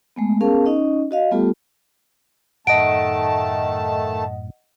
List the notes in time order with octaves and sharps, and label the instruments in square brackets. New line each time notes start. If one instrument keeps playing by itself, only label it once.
[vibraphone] G#3 A3 B3
B3 C#4 G#4 A#4 F5 A5
C#4 D#4 D#5
F#4 D#5 F5
G3 A3 B3 F4 G4 A4
[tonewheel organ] F#2 A2 [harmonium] D#3 A3 A5 [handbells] D#5 F#5 [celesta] D7